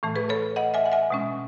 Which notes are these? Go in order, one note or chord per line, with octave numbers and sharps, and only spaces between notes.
A2 E3 A3
G#4 B4
A4 C#5
D#5 F#5
E5 G#5
F#5
E5 G#5
B2 G#3 C#4